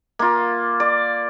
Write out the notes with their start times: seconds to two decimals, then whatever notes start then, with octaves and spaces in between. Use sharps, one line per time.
0.19 A#3 F4
0.80 D5